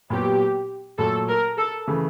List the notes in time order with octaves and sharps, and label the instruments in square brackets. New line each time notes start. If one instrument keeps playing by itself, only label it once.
[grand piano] A#2 F#3 B3 [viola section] G4
[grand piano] A#2 F#3 A3 [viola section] A4
[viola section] A#4
A4
[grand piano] C#3 E3 A3